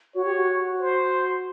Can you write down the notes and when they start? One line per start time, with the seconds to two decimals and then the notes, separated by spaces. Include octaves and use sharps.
0.15 F#4 C#5
0.25 G4
0.35 F#4
0.80 C5